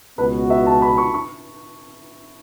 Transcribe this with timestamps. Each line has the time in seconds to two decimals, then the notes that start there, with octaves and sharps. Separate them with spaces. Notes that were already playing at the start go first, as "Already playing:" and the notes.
0.18 C#2 B2 B3 F#4 B4
0.50 E5
0.66 A5
0.82 B5
0.98 C#6
1.14 C#6